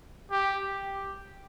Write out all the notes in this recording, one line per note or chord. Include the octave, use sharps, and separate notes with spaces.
G4